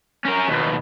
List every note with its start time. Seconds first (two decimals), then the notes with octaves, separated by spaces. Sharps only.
0.25 C#4 A#4
0.48 D#2 B2